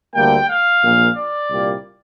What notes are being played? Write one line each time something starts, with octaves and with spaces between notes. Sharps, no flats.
D2 D3 G3 A#3 G5
F5
A#1 A#2 A#3
D5
C2 A#2 G3 A#3